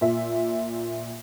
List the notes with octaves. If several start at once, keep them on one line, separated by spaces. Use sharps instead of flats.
A#2 E5